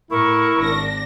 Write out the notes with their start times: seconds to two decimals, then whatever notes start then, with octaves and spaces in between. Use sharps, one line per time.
0.11 A2 E4 A#4 C#6
0.58 G#1 D4 A#6